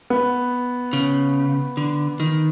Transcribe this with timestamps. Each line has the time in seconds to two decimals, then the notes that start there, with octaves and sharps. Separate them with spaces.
0.10 B3
0.93 C#3
1.77 D3
2.20 D#3